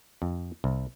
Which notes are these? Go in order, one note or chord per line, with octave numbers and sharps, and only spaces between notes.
F2
C2